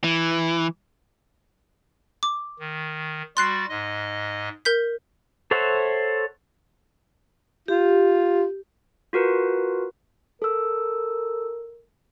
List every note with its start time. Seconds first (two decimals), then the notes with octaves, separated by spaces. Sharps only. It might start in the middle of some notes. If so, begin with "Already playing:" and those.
0.04 E3
2.23 D6
2.60 D#3
3.37 G3 F#4 C6 F#6 A6 C7
3.69 G#2 D#5
4.65 A#4 G6 B6
5.51 A4 C5 C#5 E5 F#5
7.68 F4 G4
9.13 F4 F#4 A#4 B4
10.42 A4 A#4 E6